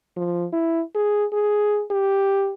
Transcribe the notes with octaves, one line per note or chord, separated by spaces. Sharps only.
F3
E4
G#4
G#4
G4